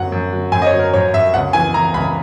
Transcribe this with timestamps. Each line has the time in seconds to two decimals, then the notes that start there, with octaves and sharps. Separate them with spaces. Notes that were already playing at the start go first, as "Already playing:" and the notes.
Already playing: F#2 F#3 F#5
0.12 F#2
0.32 F#3
0.52 F#2 G#5
0.62 D#5
0.67 C#5
0.73 F#3
0.79 A#4
0.94 F#2 C#5
1.14 F#2 E5
1.34 C#2 F#5
1.53 E3 G#5
1.74 E3 A#5
1.94 C#2 B5